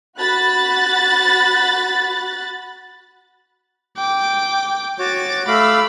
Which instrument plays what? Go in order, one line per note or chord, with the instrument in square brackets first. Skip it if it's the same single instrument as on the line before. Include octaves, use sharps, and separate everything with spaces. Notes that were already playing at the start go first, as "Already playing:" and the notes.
[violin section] F#4 B5 F#6 A6
[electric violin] G5 D6
[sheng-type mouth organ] F#4 C#5 [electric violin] D6 A6
[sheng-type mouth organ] A3 F5 D6 [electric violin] B5 E6